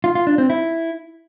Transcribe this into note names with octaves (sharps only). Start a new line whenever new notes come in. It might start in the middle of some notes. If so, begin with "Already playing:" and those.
F4
F4
D4
C4
E4